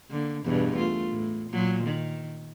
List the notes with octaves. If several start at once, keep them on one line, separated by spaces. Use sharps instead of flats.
D3 A#3
E2 G2 B2
A3 F4
A2
A#2 F#3
D#3